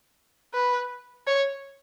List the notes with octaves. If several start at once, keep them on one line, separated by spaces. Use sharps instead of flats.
B4
C#5